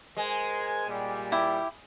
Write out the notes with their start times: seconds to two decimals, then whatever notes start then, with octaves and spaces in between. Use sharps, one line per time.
0.17 G#3 A#4 C5 G#5
0.88 A#2 G3
1.32 E4 G4